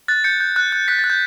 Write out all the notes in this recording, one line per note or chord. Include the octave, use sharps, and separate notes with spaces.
F#6 A6
G6 C#7
G6
F#6
F#6
F#6 B6
A6
F#6
G6